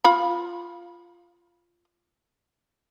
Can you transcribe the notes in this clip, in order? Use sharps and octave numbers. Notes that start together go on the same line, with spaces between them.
F4 B5